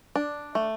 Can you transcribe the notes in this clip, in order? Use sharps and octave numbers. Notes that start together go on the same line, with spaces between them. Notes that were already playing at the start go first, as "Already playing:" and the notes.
D4
A3